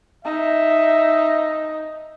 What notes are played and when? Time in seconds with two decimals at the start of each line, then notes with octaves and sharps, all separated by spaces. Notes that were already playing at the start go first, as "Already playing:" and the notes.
0.25 D#4 E5